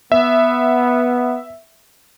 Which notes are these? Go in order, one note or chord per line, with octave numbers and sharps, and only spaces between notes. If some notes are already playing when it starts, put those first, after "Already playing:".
B3 E5